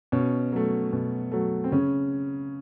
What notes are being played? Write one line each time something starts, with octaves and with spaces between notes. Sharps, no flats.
B2 C#4
F#3 A3
B2
F#3 A3
C4
C#3 C#4